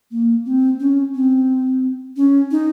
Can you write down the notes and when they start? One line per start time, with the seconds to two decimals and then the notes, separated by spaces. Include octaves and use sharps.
0.11 A#3
0.45 C4
0.80 C#4
1.15 C4
2.17 C#4
2.51 D#4